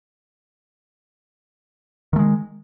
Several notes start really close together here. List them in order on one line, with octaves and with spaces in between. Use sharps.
D#3 A3 G#3